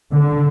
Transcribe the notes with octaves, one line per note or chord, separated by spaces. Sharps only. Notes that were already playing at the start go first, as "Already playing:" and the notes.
D3